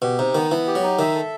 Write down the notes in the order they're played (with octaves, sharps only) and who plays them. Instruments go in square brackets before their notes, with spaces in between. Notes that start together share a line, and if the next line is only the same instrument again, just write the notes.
[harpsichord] B2 [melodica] G4
[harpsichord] C3 [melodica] D#4
[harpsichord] D#3 [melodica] B3
[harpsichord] E3 [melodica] B3
[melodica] G4
[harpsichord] F#3
[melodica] D#4
[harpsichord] D#3 [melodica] E5
[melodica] A4